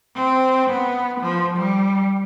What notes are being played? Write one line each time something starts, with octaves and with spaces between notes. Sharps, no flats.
C4
B3
F3
G3